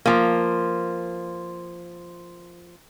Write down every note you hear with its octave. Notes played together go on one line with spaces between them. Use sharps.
F3 A#3